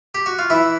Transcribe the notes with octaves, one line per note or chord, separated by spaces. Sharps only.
G4
F#4
F4
E3 E4